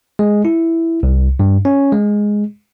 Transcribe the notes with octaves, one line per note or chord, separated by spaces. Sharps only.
G#3
E4
C2
G2
C#4
G#3